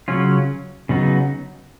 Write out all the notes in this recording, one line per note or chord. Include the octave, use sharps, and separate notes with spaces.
C#3 F#3 C#4 F4
C#3 F#3 B3 D#4